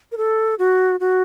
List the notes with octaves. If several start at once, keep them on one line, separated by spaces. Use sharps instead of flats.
A#4
A4
F#4
F#4